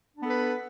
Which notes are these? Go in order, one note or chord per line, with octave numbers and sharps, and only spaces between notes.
B3 D4 A4 B4